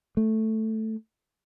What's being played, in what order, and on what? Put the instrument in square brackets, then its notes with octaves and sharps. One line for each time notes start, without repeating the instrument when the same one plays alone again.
[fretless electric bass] A3